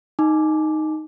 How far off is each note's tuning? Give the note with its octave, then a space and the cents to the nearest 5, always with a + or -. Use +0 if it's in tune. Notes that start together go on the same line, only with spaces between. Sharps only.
D#4 +0 G#5 +25 D6 +0